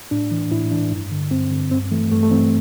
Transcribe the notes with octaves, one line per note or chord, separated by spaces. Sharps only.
A2 D4
E3
A2 E4
E3 D4
G2
D3
G2 C4
D3
G2 C4
E3 A3
G2 A3
A3
E3 C4